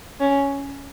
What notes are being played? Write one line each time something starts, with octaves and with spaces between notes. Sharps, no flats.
C#4